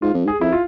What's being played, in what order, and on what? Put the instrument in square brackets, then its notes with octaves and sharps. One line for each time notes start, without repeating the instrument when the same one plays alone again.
[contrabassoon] G#2 [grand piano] F4
[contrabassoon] F2
[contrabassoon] G#2 [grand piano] G#4
[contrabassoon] F2 [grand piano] E4
[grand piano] F4